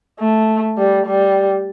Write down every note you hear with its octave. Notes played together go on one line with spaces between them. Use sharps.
A3
G3
G3